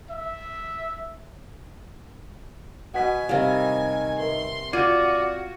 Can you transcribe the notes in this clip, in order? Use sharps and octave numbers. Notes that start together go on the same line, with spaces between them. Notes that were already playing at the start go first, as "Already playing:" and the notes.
E5
B2 F#5 G#5 B6
C3 D#3 G3 F5
A#4 B4 E5 C6
F4 F#4 D5 G#6 D#7